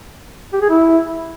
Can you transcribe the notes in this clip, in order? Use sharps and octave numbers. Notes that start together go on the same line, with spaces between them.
G4
G#4
E4